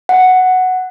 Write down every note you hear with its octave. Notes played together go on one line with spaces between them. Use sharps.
F#5